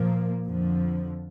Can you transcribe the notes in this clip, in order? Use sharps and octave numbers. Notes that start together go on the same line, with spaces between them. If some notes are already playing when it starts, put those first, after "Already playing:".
Already playing: A#2 F3 A#3
F2 D3 F3